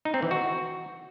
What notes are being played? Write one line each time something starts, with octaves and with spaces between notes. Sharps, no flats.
D#4
C4
E3
F#4